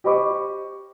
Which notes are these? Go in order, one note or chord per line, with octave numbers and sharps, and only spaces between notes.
G4 C5 D#5 B5 C#6 D6